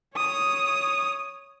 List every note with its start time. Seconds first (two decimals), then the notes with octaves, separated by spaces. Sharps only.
0.16 C#5 D#6